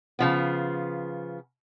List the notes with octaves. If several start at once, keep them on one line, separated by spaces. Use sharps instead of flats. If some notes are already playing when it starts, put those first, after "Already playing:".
C#3 F3 B3